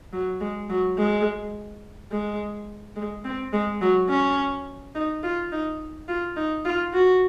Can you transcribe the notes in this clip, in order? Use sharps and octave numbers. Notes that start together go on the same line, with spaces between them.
F#3
G#3
F#3
G#3
G#3
G#3
C4
G#3
F#3
C#4
D#4
F4
D#4
F4
D#4
F4
F#4